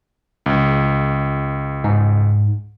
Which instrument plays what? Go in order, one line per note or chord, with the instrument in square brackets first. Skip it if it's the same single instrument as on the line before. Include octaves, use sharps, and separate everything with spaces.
[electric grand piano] C#2
[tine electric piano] G#2